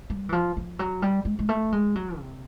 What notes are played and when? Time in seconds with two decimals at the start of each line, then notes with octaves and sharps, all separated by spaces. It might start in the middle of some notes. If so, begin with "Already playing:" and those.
0.10 G3
0.29 E3
0.32 F3
0.57 F3
0.79 F#3
1.02 G3
1.25 G#3
1.39 G#3
1.49 A3
1.72 G#3
1.95 F#3
2.18 C3